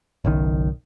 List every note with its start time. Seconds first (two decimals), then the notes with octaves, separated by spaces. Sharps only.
0.25 F#1 B1 D#3